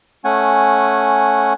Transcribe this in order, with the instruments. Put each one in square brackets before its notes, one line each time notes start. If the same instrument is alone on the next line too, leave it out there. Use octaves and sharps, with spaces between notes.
[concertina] A3 C#4 F#5 G#5